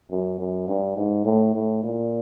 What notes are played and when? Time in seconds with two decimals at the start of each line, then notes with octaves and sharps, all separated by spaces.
0.10 F#2
0.39 F#2
0.68 G2
0.97 G#2
1.25 A2
1.54 A2
1.83 A#2